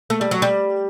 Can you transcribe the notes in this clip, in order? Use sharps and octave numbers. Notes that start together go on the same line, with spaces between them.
A3
G3
F#3
G3